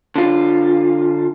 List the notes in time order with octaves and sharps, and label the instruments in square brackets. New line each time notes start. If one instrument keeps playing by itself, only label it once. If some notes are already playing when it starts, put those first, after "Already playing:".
[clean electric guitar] D3 F4